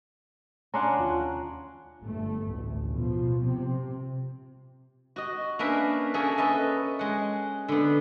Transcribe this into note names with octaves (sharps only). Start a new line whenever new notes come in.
C#4 D4 F#5 A#5 C6
D#2 F4
G1 A3
A1 D2
B2 F3
C3 C4
F#4 D#5
A#3 C#4 D4 A#4 B4 E5
A#3 C#4 F#4 G#4 A4
A4 B4 D#5 E5
G#3 F#5
D3 B3